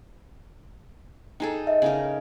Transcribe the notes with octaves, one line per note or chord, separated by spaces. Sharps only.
D#4 G#4 A4 G5 A#5
D#5 E5
C#3 D#4 A#4